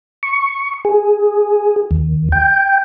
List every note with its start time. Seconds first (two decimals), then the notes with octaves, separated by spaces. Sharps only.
0.23 C#6
0.85 G#4
1.91 D#2
2.32 G5